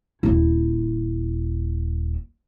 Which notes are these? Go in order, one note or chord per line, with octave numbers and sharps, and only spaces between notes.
D#1 E4